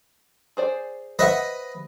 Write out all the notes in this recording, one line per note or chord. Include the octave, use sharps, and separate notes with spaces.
G#4 C5 D5
B4 C5 D#5 E5 F#5